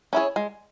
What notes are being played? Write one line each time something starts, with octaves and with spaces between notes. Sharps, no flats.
C#4 E4 G#4 C#5
G#3